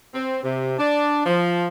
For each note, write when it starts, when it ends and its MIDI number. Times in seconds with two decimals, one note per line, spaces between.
0.14 0.39 60
0.44 0.75 48
0.78 1.23 62
1.26 1.67 53